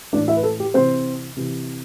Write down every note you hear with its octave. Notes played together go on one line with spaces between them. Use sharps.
A2 E3 D4 D5
E4 E5
B4
A4
G4
C3 E3 C4 C5
C3 E3